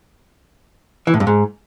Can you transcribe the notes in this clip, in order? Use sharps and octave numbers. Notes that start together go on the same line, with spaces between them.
E3
A2
G2
G#2